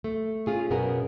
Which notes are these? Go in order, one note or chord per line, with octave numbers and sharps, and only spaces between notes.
A3
C#4 F4 G#4
F#2 B2 B3 C#4 G#4 A#4